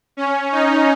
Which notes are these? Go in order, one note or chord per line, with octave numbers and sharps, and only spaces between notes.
C#4
D#4